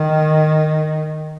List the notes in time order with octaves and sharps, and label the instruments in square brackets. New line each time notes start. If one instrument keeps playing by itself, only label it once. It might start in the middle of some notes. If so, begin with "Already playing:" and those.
Already playing: [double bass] D#3